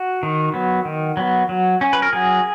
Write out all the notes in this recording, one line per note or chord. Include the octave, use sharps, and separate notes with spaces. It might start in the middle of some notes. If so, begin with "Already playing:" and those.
Already playing: F#4
D#3
F#3 B3
D#3
F#3 B3
F#3
C#4
B4
A#4
F#3 G#4